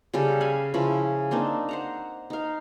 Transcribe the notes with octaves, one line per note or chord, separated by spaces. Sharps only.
C#3 G3 A4 G5
F5 G#5 B5
C#3 F3 E4 B5
A#3 C4 D4 D#4
C5 F#5 A#5
D#4 F5